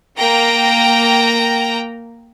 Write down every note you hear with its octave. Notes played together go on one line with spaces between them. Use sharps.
A#3 G5 A#5